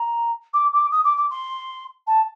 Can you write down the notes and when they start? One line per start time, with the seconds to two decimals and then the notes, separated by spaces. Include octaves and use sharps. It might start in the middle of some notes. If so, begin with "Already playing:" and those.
Already playing: A#5
0.53 D6
0.73 D6
0.91 D#6
1.04 D6
1.17 D6
1.30 C6
2.07 A5